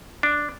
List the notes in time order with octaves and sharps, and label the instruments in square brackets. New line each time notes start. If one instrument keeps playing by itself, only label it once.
[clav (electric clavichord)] D4